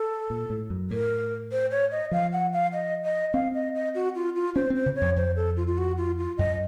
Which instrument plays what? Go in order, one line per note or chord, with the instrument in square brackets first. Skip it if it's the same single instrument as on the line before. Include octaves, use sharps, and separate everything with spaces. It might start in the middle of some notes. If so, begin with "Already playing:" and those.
Already playing: [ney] A4
[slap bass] A#2
A2
F#2
[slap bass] A2 [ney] A#4
[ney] C5
C#5
D#5
[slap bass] F3 [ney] F5
[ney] F#5
F5
D#5
D#5
[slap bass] C4 [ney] F5
[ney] D#5
D#5
F#4
F4
F4
[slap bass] C#4 [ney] C5
[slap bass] C4
[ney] C5
[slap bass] C#3
[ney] C#5
[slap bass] F2
[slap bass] F2 [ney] C5
[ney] A4
F4
F4
F#4
F4
F4
[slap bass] F#2 [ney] D#5